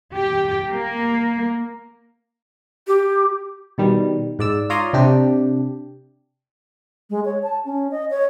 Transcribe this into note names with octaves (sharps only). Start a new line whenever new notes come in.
G4
A#3
G4
B2 D#3 G3
G#2 D5 E6
F4 C#5 D5 A#5 C6 D#6
C3 D4 G4
G#3
C#5
A5
C#4
D#5
C#5